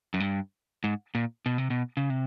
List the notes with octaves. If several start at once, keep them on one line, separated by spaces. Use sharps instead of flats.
F#2
G2
G#2
A#2
B2
C3
B2
C#3
C3